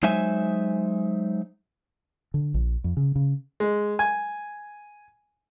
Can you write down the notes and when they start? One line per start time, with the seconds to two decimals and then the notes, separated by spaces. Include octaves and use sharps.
0.03 F#3 G#3 D#4 C5 E5 G#5
2.34 D3
2.54 A#1
2.84 F2
2.97 C#3
3.16 C#3
3.60 G#3
3.99 G#5